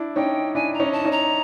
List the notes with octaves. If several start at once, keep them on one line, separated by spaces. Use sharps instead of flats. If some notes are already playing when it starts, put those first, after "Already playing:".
Already playing: D4 E4
C#4 D#4 G5
D4 E4 G#5
A#5
C#4 D#4
A5
C#4 D#4
A#5